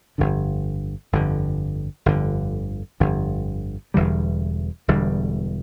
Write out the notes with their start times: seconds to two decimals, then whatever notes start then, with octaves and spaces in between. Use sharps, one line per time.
0.18 G1 F2 D3
1.12 G1 F2 D3
2.06 G1 F2 D3
3.00 G1 F2 D3
3.94 E1 E2 D3 G3
4.88 E1 E2 D3 G3